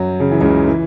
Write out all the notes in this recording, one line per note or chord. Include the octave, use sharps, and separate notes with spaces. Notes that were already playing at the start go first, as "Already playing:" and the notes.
Already playing: F#2 F#3
C#3
E3
C#2 C#3
E3